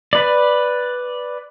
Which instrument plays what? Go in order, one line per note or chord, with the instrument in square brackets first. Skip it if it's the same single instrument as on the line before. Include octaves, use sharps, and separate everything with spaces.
[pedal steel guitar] B4 D5